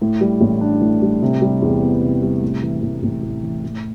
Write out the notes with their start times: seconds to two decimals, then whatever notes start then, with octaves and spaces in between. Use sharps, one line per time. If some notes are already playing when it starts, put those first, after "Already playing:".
0.01 A2
0.21 G3
0.41 A1
0.61 D4
0.81 A2
1.02 G3
1.22 C3
1.42 G3
1.62 E2
1.82 B3
2.02 C3
2.22 G3
2.42 A2
2.63 E3
2.82 A1
3.03 A1
3.23 A2
3.43 E3
3.64 A2